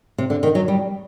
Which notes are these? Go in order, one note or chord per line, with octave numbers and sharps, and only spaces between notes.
C3
D3
D#3
F#3
G3